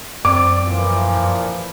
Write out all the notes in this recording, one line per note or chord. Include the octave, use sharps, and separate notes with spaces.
F#2 C4 D5 D6
A#2 E3 F3